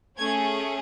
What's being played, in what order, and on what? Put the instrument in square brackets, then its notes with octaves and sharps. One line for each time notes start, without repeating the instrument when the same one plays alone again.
[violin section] A3 C#4 G#4 G#6